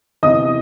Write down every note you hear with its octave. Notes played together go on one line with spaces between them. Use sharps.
E2 C3 E3 D#5 D#6